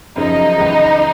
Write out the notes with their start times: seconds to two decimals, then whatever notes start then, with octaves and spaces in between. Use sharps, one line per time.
0.15 F#2 C#3 F3 D#4
0.58 C#2 C#3 E3 G#3